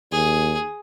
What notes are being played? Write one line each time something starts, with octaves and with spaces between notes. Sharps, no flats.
D#2 G#4